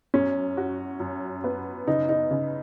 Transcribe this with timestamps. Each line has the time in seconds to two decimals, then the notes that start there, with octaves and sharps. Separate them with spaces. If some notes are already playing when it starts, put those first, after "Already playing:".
0.14 F#2 C#4
0.57 F#4
1.00 F#2
1.44 B3
1.87 C#3 D#4
2.09 D#4
2.31 C#3